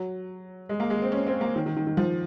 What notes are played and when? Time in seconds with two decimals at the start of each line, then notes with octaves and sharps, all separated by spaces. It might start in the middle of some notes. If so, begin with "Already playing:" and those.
Already playing: F#3
0.69 G#3
0.80 A#3
0.90 G#3
1.02 C4
1.12 C#4
1.27 C4
1.41 A#3
1.56 D#3
1.66 D#3
1.77 D#3
1.87 D#3
1.97 F3